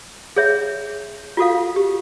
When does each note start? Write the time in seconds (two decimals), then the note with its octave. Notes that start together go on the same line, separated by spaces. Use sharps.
0.36 G#4 C#5 E5
1.37 F4 F#4 A4 F5
1.76 G4